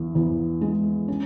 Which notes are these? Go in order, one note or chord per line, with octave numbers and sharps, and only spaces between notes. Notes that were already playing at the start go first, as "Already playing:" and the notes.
Already playing: E2
E2
G#3
C#4